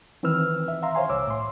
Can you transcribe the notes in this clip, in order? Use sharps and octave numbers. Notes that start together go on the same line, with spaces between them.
D#3 E3 C4 B4 E6 F6
E5
E5 F5 A#5 C6
C5 C#5 F5 G#5 C6
C2 C#5 D6 E6
A2 C6